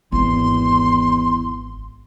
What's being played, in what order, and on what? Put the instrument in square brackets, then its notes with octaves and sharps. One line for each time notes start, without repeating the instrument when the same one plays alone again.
[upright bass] G#1 [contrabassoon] E2 [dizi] C6